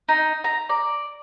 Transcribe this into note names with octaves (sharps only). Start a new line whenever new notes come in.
D#4
A#5
D5